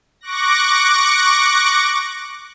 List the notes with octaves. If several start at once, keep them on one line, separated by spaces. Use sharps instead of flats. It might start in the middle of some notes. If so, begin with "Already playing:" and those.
C#6 D6 F#6 A#6